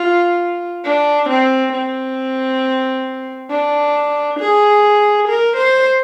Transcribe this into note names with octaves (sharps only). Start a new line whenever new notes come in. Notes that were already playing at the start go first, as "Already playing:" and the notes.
Already playing: F4
D4
C4
C4
D4
G#4
A#4
C5